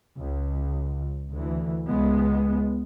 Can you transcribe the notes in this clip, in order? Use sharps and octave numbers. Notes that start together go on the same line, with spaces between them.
C#2
D2 E3
C#2 G#3 B3